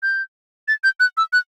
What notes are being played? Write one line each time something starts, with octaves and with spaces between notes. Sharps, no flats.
G6
A6
G6
F#6
E6
F#6